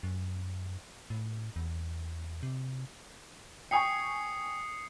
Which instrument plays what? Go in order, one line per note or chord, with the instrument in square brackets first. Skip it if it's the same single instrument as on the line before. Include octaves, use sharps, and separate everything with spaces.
[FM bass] F#2
A2
E2
C3
[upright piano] G5 G#5 C#6 [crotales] D#6 C7 C#7